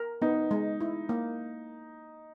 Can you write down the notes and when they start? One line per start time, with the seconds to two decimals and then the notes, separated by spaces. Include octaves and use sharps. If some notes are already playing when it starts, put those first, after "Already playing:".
Already playing: A#4
0.22 B3 D#4
0.51 G#3
0.81 E4
1.09 A#3